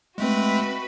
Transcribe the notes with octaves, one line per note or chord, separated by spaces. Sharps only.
G#3 A3 C4 F#4 B4